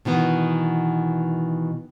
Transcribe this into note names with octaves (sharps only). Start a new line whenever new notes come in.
B2 D#3 E3 B3